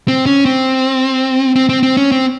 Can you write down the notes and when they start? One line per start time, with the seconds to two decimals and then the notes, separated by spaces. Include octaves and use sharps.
0.08 C4
0.26 C#4
0.45 C4
1.56 C4
1.69 C4
1.83 C4
1.97 C#4
2.12 C4